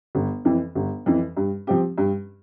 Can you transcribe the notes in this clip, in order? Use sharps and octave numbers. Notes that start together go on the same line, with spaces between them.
G1
F2 E3
G1
F2 E3
G2
F3 C4 G4
G2